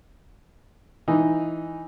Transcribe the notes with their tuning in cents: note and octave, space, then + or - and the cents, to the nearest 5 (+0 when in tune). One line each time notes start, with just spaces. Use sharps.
E3 +0 D#4 +0